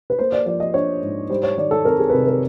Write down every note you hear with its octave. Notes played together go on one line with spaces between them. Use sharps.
B4
A#3 C5
D5
F3 D5
D#5
D4 C#5
G#2
G3 C5
C#5
D#3 D5
A4
C4 A#4
G#4
B4
C3 A#4
A#4